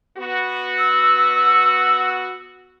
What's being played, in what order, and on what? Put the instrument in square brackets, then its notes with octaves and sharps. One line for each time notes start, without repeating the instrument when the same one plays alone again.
[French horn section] B3 F#4
[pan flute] E6